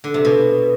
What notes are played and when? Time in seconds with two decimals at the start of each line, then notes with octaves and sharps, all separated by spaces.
0.04 D3
0.14 C3
0.25 B2